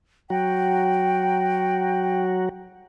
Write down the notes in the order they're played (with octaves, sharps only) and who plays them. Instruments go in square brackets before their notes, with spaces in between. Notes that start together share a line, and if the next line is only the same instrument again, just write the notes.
[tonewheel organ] F#3 F#4 [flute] G5